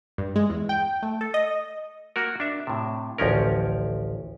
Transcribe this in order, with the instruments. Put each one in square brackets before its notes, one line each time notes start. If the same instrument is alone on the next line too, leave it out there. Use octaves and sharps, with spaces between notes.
[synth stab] G2
G#3
E2
G5
A3
A4
D#5
[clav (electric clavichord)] A#3 F#4 A#4
D4 E5
A2 C3
A1 D2 F3 C#4 A#4